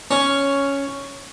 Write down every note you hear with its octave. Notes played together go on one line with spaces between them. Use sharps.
C#4